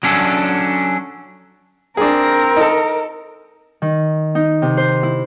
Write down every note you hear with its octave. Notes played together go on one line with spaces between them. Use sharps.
F#3 C#4 D4 A4
C4 D4 G#4 A#4
D#4 A4
D#3
D#4
C3
C5
E4